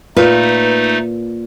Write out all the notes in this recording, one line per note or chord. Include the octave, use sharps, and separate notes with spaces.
A#2 A3 D#4 B4